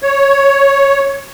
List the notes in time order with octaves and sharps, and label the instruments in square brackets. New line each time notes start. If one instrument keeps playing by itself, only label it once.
[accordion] C#5